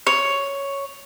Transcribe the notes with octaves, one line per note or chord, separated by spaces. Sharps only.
C#5